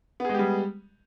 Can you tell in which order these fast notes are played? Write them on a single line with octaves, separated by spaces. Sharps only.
B3 G#4 G#3 G4 G3